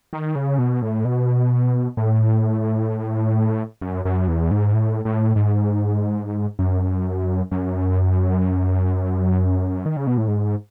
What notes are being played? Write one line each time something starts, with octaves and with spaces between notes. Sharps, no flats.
D#3
C#3
B2
A2
B2
A2
F#2
F#2
E2
G#2
A2
A2
G#2
F#2
F#2
D#3
C#3
B2
A2
G#2